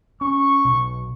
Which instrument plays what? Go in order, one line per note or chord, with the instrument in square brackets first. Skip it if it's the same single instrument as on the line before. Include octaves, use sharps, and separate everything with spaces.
[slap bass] C#4 [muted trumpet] C#6
[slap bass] B1 B2